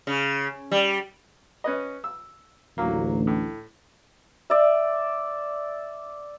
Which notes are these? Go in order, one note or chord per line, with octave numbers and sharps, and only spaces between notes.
C#3
G3
C#4 B4 D#5
E6
A1 D2 F#3 A#3
A2
D5 E5